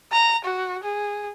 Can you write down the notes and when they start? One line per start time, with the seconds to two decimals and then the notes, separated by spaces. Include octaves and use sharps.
0.12 A#5
0.44 F#4
0.84 G#4